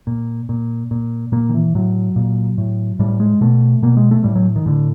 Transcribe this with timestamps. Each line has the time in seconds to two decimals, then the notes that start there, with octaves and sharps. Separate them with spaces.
0.07 A#2
0.49 A#2
0.91 A#2
1.32 A#2 A#3
1.49 D#3
1.54 E3
1.75 A2 F#3
2.16 A#2
2.58 A2
2.99 A2 G3
3.20 G#3
3.41 B2 A3
3.82 B2 A#3
3.97 G#3
4.11 A3
4.24 A2 G3
4.35 F#3
4.56 D#3
4.66 A2 D3